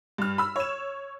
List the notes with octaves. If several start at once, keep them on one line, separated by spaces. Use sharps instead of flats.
G2 F6
B5 E6
C#5 E7